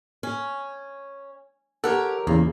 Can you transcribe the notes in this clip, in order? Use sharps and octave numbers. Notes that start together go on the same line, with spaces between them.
C#4
G4 A4 A#4 C#5 F#5
E2 C#3 A#3